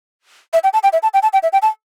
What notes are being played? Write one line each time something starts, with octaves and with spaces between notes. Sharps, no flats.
E5
G5
A5
G5
E5
A5
G5
A5
G5
E5
G5
A5